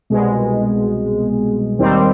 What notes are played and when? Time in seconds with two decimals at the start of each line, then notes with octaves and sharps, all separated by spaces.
0.10 C2 B2 G#3
1.78 D#2 D#3 G3 C4